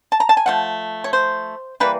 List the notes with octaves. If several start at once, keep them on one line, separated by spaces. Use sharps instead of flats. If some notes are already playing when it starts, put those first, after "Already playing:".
A5
A#5
A5
G#5
F3 A3 F#5
C#5
C5
E3 G3 A#3 B4